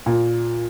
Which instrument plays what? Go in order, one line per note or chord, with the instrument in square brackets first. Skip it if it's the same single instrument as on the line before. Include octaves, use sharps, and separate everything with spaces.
[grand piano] A#2